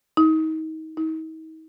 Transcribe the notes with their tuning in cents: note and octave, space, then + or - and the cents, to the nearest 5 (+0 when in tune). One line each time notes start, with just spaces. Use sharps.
D#4 +30
D#4 +40